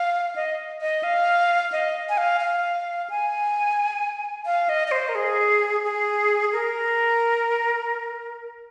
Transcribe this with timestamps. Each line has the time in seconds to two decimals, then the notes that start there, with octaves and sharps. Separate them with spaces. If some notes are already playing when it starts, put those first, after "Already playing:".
Already playing: F5
0.36 D#5
0.81 D#5
1.03 F5
1.72 D#5
2.09 G#5
2.18 F5
2.41 F5
3.10 G#5
4.46 F5
4.69 D#5
4.88 D#5
4.92 C5
5.09 A#4
5.15 G#4
5.84 G#4
6.52 A#4